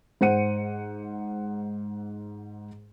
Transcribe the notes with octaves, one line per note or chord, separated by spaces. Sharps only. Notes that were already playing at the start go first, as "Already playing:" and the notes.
G#2 C5 F#5 C#7 D#7